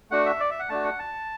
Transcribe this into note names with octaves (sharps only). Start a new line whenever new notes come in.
A3 D4 F#4 F#5
E5
D5
E5
F#5
A3 D4 F#4 A5
F#5
A5